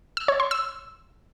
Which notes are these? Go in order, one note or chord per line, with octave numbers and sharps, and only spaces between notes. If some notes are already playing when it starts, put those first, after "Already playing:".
E6
C#5
C6
E6